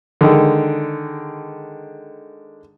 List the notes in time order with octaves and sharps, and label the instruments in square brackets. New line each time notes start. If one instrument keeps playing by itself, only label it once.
[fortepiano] D3 D#3 G#3